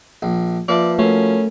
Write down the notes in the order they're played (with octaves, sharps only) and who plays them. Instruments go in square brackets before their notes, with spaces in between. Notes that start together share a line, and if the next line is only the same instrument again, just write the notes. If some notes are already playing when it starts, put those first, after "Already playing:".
[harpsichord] A#1
[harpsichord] F3 [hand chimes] A#3 B4 E5 [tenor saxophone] D5
[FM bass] A3 [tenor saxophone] C#4 [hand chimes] F#4 A#4